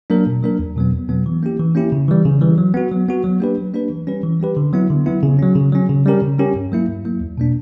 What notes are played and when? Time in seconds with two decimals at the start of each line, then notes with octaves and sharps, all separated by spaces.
0.10 F#3 A#3 D4 A#4
0.26 B2
0.43 F#3 A#3 D4 A#4
0.59 E2
0.76 B2 F#3 B3
0.93 E2
1.09 B2 F#3 B3
1.26 E3
1.43 A#3 C#4 E4 G4
1.59 E3
1.75 A#3 C#4 E4 G4
1.92 C#3
2.08 E3 G3
2.25 C#3
2.41 E3 G3
2.58 F#3
2.74 B3 F#4
2.91 F#3
3.08 B3 F#4
3.24 F#3
3.40 A#3 D4 G4 B4
3.57 F#3
3.74 A#3 D4 G4 B4
3.90 E3
4.07 G3 C#4 G4 B4
4.23 E3
4.40 G3 C#4 G4 B4
4.57 D3
4.73 F#3 B3 E4
4.90 D3
5.06 F#3 B3 E4
5.23 C#3
5.39 F#3 C#4
5.55 C#3
5.72 F#3 C#4
5.89 C#3
6.06 G3 C#4 G4 A#4
6.22 C#3
6.39 G3 C#4 G4 A#4
6.56 G2
6.72 F#3 A#3 E4
6.88 G2
7.05 F#3 A#3 E4
7.21 E2
7.38 B2 A#3 D4